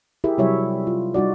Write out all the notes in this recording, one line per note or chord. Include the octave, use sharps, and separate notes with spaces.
E4 G4 G#4 A#4 E5
C3 F#3 G3 E4 C#5 E5
F4
G3 D#4 F#4 D5